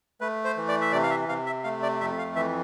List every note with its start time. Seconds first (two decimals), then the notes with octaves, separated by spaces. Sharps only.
0.21 A3 B4
0.44 C5
0.57 E3
0.68 D5
0.81 E5
0.92 C3 D5
1.03 F5
1.10 E5
1.29 C3 F5
1.46 E5
1.64 A3 F5
1.82 D5
2.00 F2 E5
2.18 F5
2.36 E3 E5